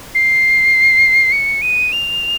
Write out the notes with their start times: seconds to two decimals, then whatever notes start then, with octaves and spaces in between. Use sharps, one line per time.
0.15 C7
1.32 C#7
1.62 D#7
1.92 F7